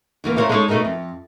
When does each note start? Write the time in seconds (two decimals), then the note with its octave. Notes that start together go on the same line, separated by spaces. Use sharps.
0.24 D2 E3 A#3
0.37 A3 E4 A#4 C5 C#5 F5
0.49 G#3 D#4 E4 G#4 A4 C#5
0.68 B2 A3 D#4 G#4 A#4
0.85 F2